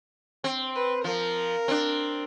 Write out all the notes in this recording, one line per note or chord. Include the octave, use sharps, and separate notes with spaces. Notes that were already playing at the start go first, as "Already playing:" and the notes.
C4
B4
F3 A#4
C4 D4